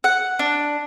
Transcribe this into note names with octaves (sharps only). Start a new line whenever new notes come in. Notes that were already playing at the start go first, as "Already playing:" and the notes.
F#5
D4